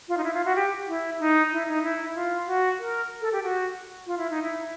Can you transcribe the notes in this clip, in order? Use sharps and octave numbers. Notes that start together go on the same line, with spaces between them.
F4
D#4
E4
F4
F#4
G4
E4
D#4
E4
D#4
E4
F4
F#4
A#4
A4
G4
F#4
F4
E4
D#4
E4